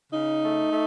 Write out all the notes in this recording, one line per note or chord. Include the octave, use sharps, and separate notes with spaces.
C#3 D#4
A3
A3